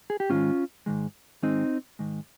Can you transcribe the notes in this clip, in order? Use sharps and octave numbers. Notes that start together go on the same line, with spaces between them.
G#4
G4
G#2 D#3 G#3 C#4 F4
G#2 D#3 G#3
G#2 D#3 G#3 C4 D#4
G#2 D#3 G#3